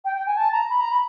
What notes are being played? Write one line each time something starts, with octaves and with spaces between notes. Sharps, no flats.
G5
G5
G#5
A5
A#5
B5
A#5
B5